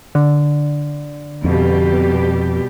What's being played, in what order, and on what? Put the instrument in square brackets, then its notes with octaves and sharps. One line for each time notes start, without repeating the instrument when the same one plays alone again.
[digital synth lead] D3
[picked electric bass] F2 [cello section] B2 G3 G4